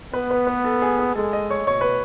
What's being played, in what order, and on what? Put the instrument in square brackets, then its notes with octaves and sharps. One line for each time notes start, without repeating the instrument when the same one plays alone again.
[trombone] B3 [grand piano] B4
[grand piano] B4
B4
A4
G#4
G#4
[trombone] G#3 [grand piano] A4
[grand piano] D#5
C#5
[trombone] B2 [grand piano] C#5
[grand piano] B4